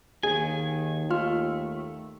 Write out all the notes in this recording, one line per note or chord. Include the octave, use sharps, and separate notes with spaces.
D#2 D#3 G#4 G#5
A3 F4 F6